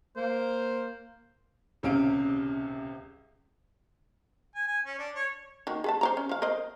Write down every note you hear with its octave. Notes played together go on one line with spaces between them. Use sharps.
A#3 C5
D#1 C#2 C3 C#4 F5 D7
G#5
G#5
C#4
D4
C#5
D#3 A#3 F#4
G#4 B4 A5
C5 D5 A#5
C#4
F3 F5
A#4 C5 D#5